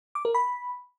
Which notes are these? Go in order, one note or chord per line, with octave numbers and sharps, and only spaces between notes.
D6
A#4
B5